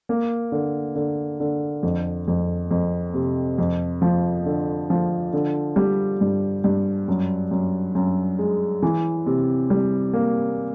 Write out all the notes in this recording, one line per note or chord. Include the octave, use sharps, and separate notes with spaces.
A#3
D3
D3
D3
F2
F2
F2
C3
F2
F3
D3
F3
D3
G3
G2
G2
F#2
F#2
F#2
G#3
E3
C3
G3
A#3